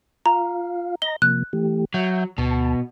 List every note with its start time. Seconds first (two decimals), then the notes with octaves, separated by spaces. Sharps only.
0.26 F4 F5 A#5
1.02 D#5 A#5 A#6 G7
1.22 C3 F3 A#3 F#6
1.53 E3 A3 G4
1.94 F#3 E5 F#5 G6
2.38 D2 B2 A5